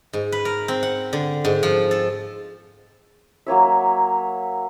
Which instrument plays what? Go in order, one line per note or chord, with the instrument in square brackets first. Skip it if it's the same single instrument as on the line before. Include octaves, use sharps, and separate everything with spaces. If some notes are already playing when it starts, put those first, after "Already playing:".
[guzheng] G#2
B4
A#4
C4
F#5
D3
G#2
F3
A4
[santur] F#3 A#3 C#5 E5